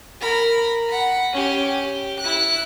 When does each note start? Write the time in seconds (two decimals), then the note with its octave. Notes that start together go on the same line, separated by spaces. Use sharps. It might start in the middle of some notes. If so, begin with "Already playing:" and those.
0.20 A#4 B5
0.89 F#5 B5
1.32 C#4 G4
1.66 G4
2.20 E4 F#6